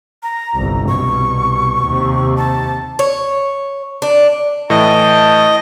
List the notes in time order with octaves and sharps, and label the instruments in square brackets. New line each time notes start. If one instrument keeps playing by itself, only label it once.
[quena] A#5
[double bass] G1 C2
[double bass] C2 B2 [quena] C#6
[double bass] D#2 C3
[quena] A5
[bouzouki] C#5
D4
[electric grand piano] A2 E3 [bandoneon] D#5 [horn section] G5 A5